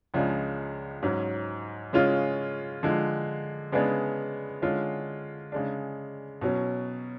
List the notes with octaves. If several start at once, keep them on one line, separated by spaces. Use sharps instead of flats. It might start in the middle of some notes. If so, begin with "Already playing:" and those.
C#2 C#3 F3 G#3 D4
G#2 F#3 C#4
C#3 G#3 C#4 F4
D3 F3 G#3
C#3 G#3 B3 D4 G#4
D3 G#3 C#4 F4
C#3 G#3 D4
B2 F#3 C#4